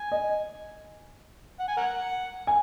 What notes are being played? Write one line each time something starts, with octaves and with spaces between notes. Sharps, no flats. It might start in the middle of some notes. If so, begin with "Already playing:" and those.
Already playing: G#5
D#5
F#5
G#5
A#4 F#5
G#5